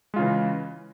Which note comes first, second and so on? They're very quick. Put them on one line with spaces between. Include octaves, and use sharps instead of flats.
G#3 F4 C#3 E3